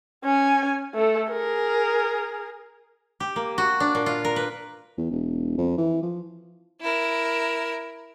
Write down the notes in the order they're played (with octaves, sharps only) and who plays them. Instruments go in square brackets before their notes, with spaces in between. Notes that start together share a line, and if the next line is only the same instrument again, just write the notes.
[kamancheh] C#4 G#5
A3 A4
G#4 A#4
[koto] G4
A#3
F#4
D4
A#2
F4
A#4
B4
[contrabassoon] E2
E1
F2
E3
F3
[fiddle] E4 A#4